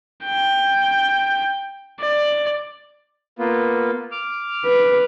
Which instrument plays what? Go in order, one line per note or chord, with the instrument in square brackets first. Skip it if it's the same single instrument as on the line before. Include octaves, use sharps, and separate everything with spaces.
[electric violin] G5
D5
[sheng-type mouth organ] A#3 B3 F4
D6 F6
[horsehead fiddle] B4